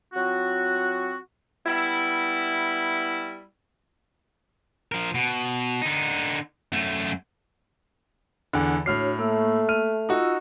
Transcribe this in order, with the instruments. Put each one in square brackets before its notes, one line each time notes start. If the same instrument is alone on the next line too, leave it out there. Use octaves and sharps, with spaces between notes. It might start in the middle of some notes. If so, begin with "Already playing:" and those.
[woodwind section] F#3 C4 F4 F#4
[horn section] G3 B3 E4
[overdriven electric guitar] F3 A#4
B2
D3 D#4
F#2 A3
[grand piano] E2 D3
[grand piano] A2 F6 C7 [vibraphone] D4 F#4 C#5
[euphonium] A3 [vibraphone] A#3 E6
[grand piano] F6 D#7
[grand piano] D#4 F#4 [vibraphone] F4 E6